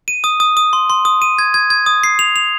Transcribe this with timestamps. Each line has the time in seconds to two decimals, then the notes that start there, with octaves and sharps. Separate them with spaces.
0.08 D#7
0.24 D#6
0.40 D#6
0.57 D#6
0.73 C6
0.90 C6
1.05 D#6
1.22 D#7
1.39 G#6
1.54 G#6
1.70 G#6
1.86 D#6
2.04 C7
2.19 F7
2.36 F7